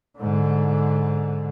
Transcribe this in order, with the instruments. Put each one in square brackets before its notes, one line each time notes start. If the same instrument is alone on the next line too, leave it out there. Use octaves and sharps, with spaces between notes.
[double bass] G#2 D3